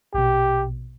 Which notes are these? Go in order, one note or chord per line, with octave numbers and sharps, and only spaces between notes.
A#1 B2 G4